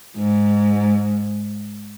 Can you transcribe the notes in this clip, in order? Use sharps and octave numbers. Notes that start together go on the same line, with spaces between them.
G#2